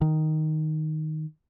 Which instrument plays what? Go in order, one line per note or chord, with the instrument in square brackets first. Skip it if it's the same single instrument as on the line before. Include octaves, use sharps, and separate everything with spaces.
[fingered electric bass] D#3